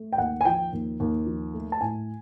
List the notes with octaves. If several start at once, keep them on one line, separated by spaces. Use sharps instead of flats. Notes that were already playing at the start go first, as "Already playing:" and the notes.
Already playing: A3
G5
D#2 F#5
G#5
F3 G5
D#2
D#2
F3
A3
A5
A2 G#5